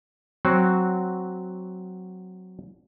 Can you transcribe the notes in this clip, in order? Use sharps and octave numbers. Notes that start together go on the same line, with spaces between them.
F#3 C4 F#4